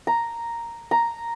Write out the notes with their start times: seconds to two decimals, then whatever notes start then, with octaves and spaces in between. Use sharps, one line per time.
0.07 A#5
0.91 A#5